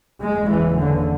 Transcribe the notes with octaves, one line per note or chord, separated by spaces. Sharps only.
F#1 E2 C#3 G#3
E3
D3